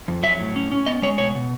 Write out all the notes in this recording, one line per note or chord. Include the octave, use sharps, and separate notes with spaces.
F2
F#3 E5
A2
C#4
C#4
B3 D#5
G#3 C#5
B2 C#5
B2